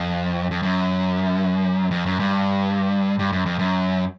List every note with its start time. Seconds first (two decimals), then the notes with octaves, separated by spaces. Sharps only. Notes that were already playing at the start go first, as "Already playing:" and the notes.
Already playing: F2
0.51 F2
0.63 F#2
1.91 F2
2.06 F#2
2.19 G2
3.19 G2
3.33 F#2
3.46 F2
3.59 F#2